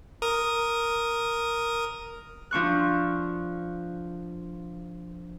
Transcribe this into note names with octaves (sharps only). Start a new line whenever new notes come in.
A#4 D#6
F3 D4 C#6 F#6